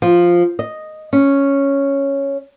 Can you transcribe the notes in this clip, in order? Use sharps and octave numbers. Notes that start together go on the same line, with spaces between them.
F3
D#5
C#4